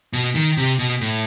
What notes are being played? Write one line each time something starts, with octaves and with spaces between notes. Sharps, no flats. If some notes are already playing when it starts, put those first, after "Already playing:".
B2
D#3
C3
B2
A2